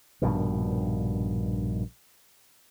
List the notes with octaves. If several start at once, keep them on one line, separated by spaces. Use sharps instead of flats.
A#1 G2 B2 D#3